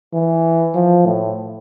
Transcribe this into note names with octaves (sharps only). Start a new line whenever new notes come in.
E3
F3
A2